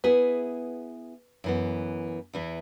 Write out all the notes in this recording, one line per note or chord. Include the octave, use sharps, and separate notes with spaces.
B3 E4 G#4 B4
F#2 E3 B3
E2 E3 E4